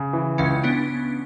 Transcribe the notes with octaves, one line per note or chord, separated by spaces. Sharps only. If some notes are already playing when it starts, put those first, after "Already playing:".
Already playing: C#3
E3
C#2 C#4
B3 D4